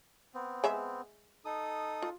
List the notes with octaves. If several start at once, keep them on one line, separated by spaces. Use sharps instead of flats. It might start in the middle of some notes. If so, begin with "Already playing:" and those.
B3 C4
G#3 E5 B5
D#4 A4 D#6
F4